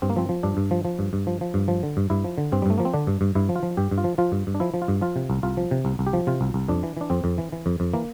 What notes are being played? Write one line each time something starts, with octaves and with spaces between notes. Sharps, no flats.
G2 C4
A#3
F3 C4
F3
G2 D4
G2
F3
F3
G2
G2
F3
F3
G2
F3
D3
G2
G2 E4
F3
D3
G2 C4
G3
G2 A3
F3 A#3
C4
D3 D4
G2
G2
G2 E4
F3
F4
F3
G2 G4
G2
F4
F3
F3 F4
G2
G2
D4
F3 E4
F3
F4
G2
F3 F4
C3
C2
C2 F4
F3
C3
C2
C2
G4
F3
C3 F4
C2
C2
F2 D4
E3
E3 D4
F2 C4
F2
E3
E3
F2
F2
E3 A#3